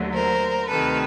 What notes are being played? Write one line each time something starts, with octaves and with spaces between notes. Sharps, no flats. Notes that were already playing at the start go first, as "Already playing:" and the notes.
Already playing: D#2 D3 F#3 A3
A#4 C5
D2 C3 D#3 A4 B4